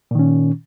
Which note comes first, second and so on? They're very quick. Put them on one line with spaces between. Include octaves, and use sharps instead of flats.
A#2 D#3 C#4